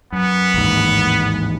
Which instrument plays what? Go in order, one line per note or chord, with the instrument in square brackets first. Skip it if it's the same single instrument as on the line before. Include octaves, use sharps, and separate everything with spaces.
[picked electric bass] F#2 [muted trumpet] B3
[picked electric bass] A1 D#2 G#2